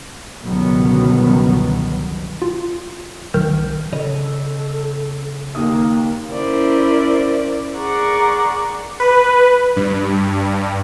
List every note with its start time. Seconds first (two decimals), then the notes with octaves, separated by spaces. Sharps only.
0.42 G1 C#2 B2 D#3 F#3 B3
2.42 F4
3.34 B1 D#3 F6 G6 E7
3.93 C#3 A4 C#5 D#5
5.55 D#2 A#3 D#6
6.31 C#4 E4 A#4 C5 D5
7.77 G#4 A#4 D5 F#5 C#6
9.00 B4
9.76 G2